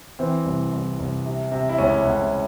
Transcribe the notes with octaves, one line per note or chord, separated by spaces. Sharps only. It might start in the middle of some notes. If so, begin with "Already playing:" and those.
E3 C4
C2
C2
C2
C3
C3
E4
C#2 C#4
C#2